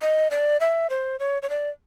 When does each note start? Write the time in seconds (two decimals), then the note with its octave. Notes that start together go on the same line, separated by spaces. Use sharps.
0.02 D#5
0.31 D5
0.61 E5
0.90 C5
1.20 C#5
1.42 C#5
1.50 D5